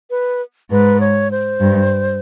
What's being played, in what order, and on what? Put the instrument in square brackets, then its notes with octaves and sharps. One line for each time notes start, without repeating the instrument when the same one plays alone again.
[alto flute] B4
[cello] G#2 [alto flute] B4
[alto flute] C#5
C5
[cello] G2